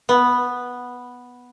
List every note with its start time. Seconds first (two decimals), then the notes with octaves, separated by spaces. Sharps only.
0.09 B3